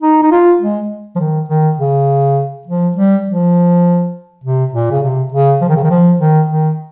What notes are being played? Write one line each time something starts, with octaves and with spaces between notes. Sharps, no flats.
D#4
D#4
F4
G#3
F3
D#3
D#3
C#3
F3
G3
F3
C3
A#2
C#3
C3
C#3
F3
D#3
C#3
D#3
F3
D#3
D#3